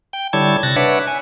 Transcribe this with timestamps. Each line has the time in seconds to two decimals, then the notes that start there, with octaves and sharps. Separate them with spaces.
0.13 G5
0.33 D3 G3 E4 C#5 A5 G#6
0.63 C3 F#6 A6 A#6
0.76 D4 B4 C#5 E5 F#5
1.07 G#5